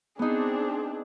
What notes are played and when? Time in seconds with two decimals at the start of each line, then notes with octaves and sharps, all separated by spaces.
0.19 B3 C4 D4 D#4 G#4